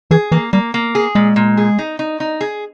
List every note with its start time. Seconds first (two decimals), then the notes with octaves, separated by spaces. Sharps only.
0.11 E3 G#4
0.32 E3 A#3
0.53 G3 A#3
0.74 A#3
0.95 G#4
1.15 A#2 G#3
1.36 A#2
1.57 G#4
1.79 D#4
1.99 D#4
2.20 D#4
2.41 G#4